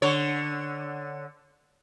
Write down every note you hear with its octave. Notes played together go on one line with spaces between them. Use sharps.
D3 C#5